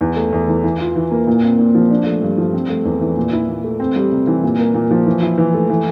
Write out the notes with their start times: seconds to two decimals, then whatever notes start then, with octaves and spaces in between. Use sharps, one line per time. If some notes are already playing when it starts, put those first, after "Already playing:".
0.01 E2
0.16 A3
0.33 E2
0.48 E3
0.64 E3
0.80 F4
0.96 E3
1.11 A#3
1.27 A#2
1.43 C4
1.58 A#2
1.75 F3
1.90 D4
2.06 A3
2.22 G2
2.38 F3
2.54 C4
2.69 A3
2.85 E2
3.01 E3
3.17 A#2
3.32 E4
3.49 A#2
3.64 A3
3.80 C4
3.96 G3
4.12 C3
4.27 E3
4.43 A#2
4.59 A#3
4.74 A#2
4.91 F3
5.06 E3
5.22 E4
5.38 E3
5.54 A3
5.70 E3